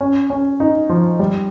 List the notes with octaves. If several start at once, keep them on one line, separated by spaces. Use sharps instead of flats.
C#4
C#4
D#4
F3
G3